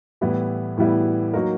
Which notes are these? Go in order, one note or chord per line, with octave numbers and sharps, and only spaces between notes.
A2 E3 G3 B3 E4
A2 E3 G3 B3 E4
F#3 A#3 D#4 F#4 A#4